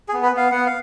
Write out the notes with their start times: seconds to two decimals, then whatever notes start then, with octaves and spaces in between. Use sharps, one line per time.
0.08 G#4
0.14 B3
0.23 B4
0.32 B3 F5
0.51 B3 F#5
0.66 F5